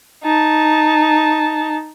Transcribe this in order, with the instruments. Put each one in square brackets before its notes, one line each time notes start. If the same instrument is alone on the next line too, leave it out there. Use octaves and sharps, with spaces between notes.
[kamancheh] D#4 A5